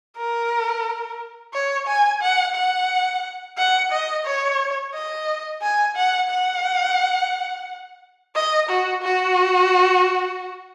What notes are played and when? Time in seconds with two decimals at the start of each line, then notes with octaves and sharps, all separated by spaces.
0.17 A#4
1.53 C#5
1.88 G#5
2.21 F#5
2.55 F#5
3.58 F#5
3.92 D#5
4.25 C#5
4.94 D#5
5.62 G#5
5.96 F#5
6.30 F#5
8.35 D#5
8.69 F#4
9.03 F#4